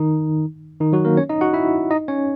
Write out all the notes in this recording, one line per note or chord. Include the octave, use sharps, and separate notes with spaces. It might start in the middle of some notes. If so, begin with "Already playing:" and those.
Already playing: D#3 D#4
D#3 D#4
F#3 F#4
A#3 A#4
C#4 C#5
D#4 D#5
F#4 F#5
E4 E5
D#4 D#5
C#4 C#5